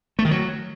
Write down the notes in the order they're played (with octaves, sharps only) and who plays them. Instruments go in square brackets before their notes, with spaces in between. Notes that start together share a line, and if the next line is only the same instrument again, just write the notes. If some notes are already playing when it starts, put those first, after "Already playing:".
[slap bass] A3
D#3
F#3